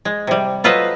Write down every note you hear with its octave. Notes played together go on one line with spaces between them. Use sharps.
G#3
C3 G3
F#3 F4 A4 B4 C5 D#5